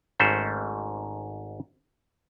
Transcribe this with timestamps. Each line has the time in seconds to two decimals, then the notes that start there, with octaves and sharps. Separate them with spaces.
0.20 G#1 G#2 A3 C#4 C5